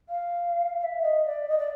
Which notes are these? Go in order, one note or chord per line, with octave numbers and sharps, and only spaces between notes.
F5
F5
E5
D#5
D5
D#5
D5